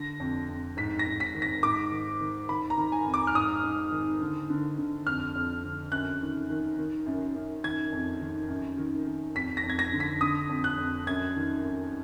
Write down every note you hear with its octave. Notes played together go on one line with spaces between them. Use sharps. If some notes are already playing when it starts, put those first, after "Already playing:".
Already playing: D3 A#6
F2
F2
G#2 B6
A#6
G#2
B6
D#3
A#6
G#2 D6
D#3
D#3
D#3 B5
A#5
D#3
G#5
F2
D6
F6
G#2 D#6
G#2
D#3
D3
D3
D3
F2 F6
F2
D3
F#2 F#6
D#3
D#3
D#3
F#2
F#2
D#3 G#6
F2
D#3
F#2
D#3
D#3
F2 B6
A#6
F2
G#6
A#6
D3
B6
D3 D#6
F2
F#6
F2
F#2 G#6
D#3
F#2